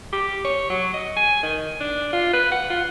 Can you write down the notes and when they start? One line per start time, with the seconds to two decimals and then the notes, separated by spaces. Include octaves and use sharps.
0.13 G4
0.44 C#5
0.70 F#3
0.94 D#5
1.16 G#5
1.43 D#3
1.80 D4
2.13 F4
2.33 B4
2.52 F#5
2.70 F4